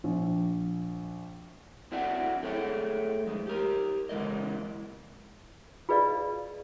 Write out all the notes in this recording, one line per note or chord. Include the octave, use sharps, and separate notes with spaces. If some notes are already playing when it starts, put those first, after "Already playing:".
A#1
C4 D4 E4 F#4 E5 G5
A3 G#4 C#5 G5
F2 G#3
G4 A#4
C#3 E3 G#3 A#4 D#5
F4 G#4 B4 D5 D#5 F5